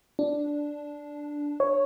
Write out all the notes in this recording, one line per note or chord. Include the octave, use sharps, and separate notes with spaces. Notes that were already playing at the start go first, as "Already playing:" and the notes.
D4
C#5